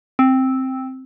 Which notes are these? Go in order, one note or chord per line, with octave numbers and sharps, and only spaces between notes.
C4